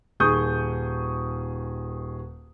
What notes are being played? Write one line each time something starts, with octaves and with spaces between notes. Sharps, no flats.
D#1 D#3 G#4 C#6 D#6 G6